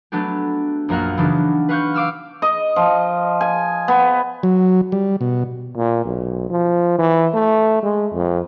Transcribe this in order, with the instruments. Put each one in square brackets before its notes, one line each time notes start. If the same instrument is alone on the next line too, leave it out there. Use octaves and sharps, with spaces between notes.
[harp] F#3 A3 B3 D4 G4
A#1 F#2 A#3 F5 F#5
C#3 E3 F#3 B3 D4 D#4
B4 F5 F#5 C#6 F#6 G6
F5 D6 E6 F6
[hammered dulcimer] D#5
F3
G#5
B3
[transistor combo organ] F#3
G3
B2
[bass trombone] A#2
B1
F3
E3
A3
G#3
F2